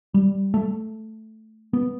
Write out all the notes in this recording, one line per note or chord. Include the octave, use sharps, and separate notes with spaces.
G3
A3
B3